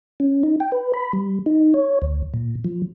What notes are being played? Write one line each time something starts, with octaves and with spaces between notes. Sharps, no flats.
C#4
D#4
G5
B4
B5
G3
D#4
C#5
D2
A#2
F3